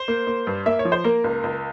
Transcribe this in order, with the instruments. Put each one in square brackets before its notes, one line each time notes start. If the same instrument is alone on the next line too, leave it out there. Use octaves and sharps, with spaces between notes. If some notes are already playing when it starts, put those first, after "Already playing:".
Already playing: [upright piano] C5
A#3
A#3
G2
A#3 E5
C#5
F3
C5
A#3 A#4
C#2
C#2